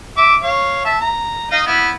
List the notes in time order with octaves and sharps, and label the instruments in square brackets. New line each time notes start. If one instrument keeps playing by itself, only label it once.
[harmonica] E5 D6
C#5 F5
E5 A5
A#5
D#4 D#5 F5
B3 E4